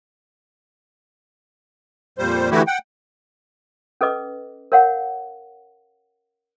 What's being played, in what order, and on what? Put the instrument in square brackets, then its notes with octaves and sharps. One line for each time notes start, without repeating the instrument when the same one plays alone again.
[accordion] F2 A#2 G3 C5
D3 E3 A3 E4 F#4 G4
F#5 G5
[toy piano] C#4 A4 B4 D#5 D6
A#4 C#5 F5 F#5